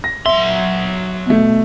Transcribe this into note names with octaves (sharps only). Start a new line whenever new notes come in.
A#6
F#3 E5 C6
B2 A3